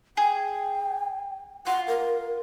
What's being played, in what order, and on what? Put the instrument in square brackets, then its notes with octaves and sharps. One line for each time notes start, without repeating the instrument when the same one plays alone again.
[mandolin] G#4 [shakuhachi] G5
[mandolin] F4 [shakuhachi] F#5
[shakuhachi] A#4